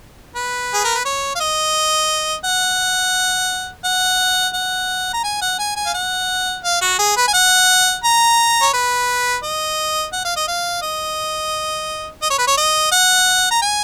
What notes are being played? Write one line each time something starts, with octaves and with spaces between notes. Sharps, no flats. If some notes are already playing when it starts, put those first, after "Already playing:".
B4
G#4
A#4
B4
C#5
F5
D#5
F#5
F#5
F#5
A#5
G#5
F#5
G#5
G#5
F5
F#5
F5
F#4
G#4
B4
G#5
F#5
A#5
C#5
B4
D#5
F#5
F5
D#5
F5
D#5
D#5
C#5
B4
C#5
D#5
F#5
A#5
G#5